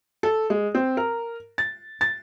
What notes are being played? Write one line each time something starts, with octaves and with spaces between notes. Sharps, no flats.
A4
G#3
C4
A#4
A6
A6